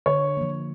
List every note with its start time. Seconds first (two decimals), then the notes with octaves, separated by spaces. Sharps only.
0.06 D3 C#5
0.37 F3 A#3